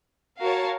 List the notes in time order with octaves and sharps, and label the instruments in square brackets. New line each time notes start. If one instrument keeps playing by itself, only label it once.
[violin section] F#4 A#4 C#5 F5 A5